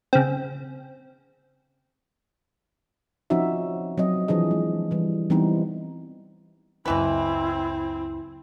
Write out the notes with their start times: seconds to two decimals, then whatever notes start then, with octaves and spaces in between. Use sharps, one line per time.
0.13 C#3 C4
3.30 F3 C4 C#4 D#4 F#4 E5
3.98 F#3 C4 D#5
4.28 E3 F3 D4 G#4 D#5
4.51 G#3
4.91 E3 G3
5.30 E3 G3 B3 C4 D#4
6.86 C#2 F#2 B2 E3 C4 E4 B4